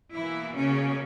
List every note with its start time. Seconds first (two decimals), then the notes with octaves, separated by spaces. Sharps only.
0.15 B2 E3 A#3 E4
0.56 C#3 C#4